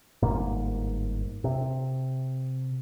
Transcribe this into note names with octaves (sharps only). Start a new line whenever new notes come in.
G1 G#2 A#3
C3